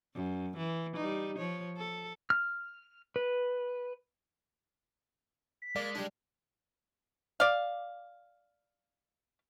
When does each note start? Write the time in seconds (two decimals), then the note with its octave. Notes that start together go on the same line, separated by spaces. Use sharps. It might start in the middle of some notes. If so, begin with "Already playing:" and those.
0.15 F#2
0.57 E3
0.96 G3 D#4
1.38 F3 C#5
1.77 A4
2.30 F6
3.16 B4
5.62 B6
5.76 G#3 A#3 D5
5.95 G3 D4
7.40 D5 F5